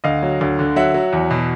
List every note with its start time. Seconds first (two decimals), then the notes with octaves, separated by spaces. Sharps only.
0.04 D2 D#5 F5
0.23 F#3
0.41 D2
0.59 D3
0.76 F#3 E5 F#5
0.94 F#3
1.13 E2
1.31 B2